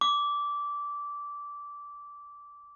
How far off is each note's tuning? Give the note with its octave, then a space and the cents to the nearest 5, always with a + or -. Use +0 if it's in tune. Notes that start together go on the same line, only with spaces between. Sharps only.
D6 -15